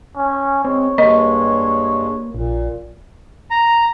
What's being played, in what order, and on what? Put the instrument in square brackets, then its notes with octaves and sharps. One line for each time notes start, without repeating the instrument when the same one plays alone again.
[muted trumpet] C#4
[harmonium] G#3 [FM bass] C4 [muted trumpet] C#5
[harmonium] G2 G#3 [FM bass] A#3 [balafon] D#5
[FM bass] A#1 [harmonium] A#2
[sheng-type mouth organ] A#5